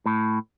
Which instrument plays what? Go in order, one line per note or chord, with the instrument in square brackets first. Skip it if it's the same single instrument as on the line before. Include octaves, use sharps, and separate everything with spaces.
[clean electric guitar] A2